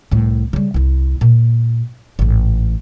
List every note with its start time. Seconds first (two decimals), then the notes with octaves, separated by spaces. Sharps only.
0.11 C2 A2
0.53 C#3 G3
0.74 C2 E4
1.21 A#2
2.19 A1 G#2